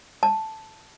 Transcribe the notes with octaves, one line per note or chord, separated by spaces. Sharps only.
A5